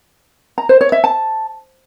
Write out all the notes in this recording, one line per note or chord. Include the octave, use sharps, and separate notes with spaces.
A#5
C5
C#5
E5
A5